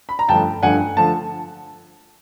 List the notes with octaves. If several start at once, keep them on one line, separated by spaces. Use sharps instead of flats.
B5
A#5
G2 D3 F3 A3 G5 A5
G2 D3 F3 A3 F#5 G#5
D3 F3 A3 A5